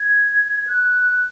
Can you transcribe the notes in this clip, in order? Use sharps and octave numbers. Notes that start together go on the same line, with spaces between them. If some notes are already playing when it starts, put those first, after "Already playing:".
Already playing: G#6
F#6